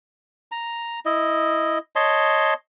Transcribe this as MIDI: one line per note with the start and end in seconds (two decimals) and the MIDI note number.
0.52 1.00 82
1.06 1.78 64
1.06 1.78 75
1.96 2.54 73
1.96 2.54 75
1.96 2.54 81
1.96 2.54 84